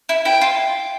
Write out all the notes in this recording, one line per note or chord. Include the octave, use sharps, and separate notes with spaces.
E4
E4 G5
F4